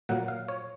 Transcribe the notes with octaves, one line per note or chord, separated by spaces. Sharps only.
A#2 F#3 A#3 F#5
F5
C#5